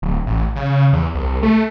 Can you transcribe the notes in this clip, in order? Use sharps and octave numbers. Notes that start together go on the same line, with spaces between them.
D1
A1
C#3
E2
C2
A3